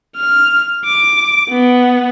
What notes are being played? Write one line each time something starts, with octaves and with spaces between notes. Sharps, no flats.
F6
D6
B3